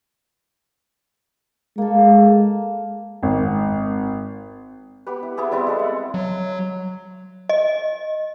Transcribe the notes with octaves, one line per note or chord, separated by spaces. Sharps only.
G#3 A#3 A4
G#1
B3 G4 B4
E4
B3 E4 G#4
G3 C4 E4 B4
G#3 A4
F#5
F#3
D#5